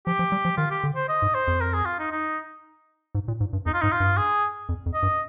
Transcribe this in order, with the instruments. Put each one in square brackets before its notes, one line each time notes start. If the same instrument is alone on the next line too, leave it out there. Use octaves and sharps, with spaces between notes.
[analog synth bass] F3 [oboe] G4
[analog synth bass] F3
G3
F3
[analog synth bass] D#3 [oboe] F4
[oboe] G4
[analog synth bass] D3
[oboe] C5
D#5
[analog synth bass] G#2
[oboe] C5
[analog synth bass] F2
[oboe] A#4
G#4
F4
D#4
D#4
[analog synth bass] G#2
A#2
G#2
G2
[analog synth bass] F2 [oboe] D#4
[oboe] F4
[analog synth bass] G#2 [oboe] D#4
[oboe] F4
[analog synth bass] G2
[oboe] G#4
[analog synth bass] F2
F2
[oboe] D#5
[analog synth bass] G2